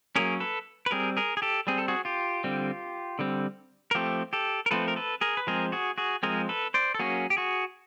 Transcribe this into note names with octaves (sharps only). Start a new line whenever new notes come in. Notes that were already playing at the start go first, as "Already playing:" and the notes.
F#3 A#3 C#4 G#4 A#4
A4 B4
B4
G3 C4 G#4 A#4
G#4 A#4
G#4
G4 A4
G3 C4 G#4
A4
F#4 G#4
F4 G4
D3 G3 C4
D3 G3 C4
A#4
F3 A3 C4 G4 A4
G4 A4
A#4
F3 A3 C4 A4 B4
A#4
A4 B4
G#4 A#4
B4
F3 G#3 C4 G#4 A#4
F#4 G#4
F#4 G#4
F3 G#3 C4 G#4 A#4
A4 B4
C5 D5
A4
F#3 A#3 C#4 F#4 G#4
G4
F#4 G#4